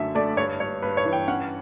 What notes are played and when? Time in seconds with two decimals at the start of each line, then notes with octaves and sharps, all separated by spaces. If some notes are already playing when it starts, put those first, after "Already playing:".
Already playing: F#2 D3 A3 E5
0.15 A3 D5
0.37 G2 C#5
0.60 G2 C#5
0.82 G2 B4
0.97 C#5
1.05 E3
1.13 G5
1.28 C#4 F#5